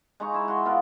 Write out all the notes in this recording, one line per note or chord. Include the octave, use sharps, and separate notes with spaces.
G#3 D#4 A#5 C#6
E4 E5
F#4 C6
B3 F4 A#4